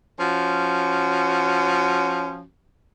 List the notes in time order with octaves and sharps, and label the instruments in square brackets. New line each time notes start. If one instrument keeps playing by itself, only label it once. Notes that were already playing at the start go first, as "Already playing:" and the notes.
[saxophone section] F3 C#4 F#4